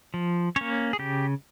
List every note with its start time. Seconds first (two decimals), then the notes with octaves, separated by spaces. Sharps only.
0.14 F3
0.56 A#3 C#4 C#5
0.93 G#4
0.99 C#3 G4